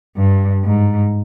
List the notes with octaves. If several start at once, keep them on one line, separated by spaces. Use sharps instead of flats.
G2
G#2